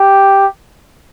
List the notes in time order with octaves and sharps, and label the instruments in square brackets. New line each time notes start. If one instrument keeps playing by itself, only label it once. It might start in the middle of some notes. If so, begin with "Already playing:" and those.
Already playing: [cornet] G4